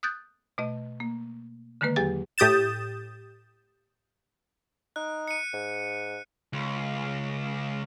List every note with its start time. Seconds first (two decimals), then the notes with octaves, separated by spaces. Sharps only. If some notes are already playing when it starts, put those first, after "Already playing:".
0.03 D#6 F#6 G6 A6
0.58 B2 A3 D#5
1.00 A#3
1.81 D3 D#3 G#3 A#3 B4
1.96 E2 F#3 G4 G#4 A6
2.38 A2 G4 D#6 G6 A6 E7
4.96 D#4 F#6
5.28 C#7 D#7
5.53 G#2
6.53 C#2